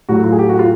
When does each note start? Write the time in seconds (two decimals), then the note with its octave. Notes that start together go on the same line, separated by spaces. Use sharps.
0.09 A2 F#3 A3 F#4
0.24 F4
0.33 G#4
0.39 G4
0.49 F#4
0.59 F4